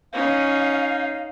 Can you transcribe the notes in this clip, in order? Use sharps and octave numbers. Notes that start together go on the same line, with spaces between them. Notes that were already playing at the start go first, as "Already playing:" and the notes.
C#4 D#4 F5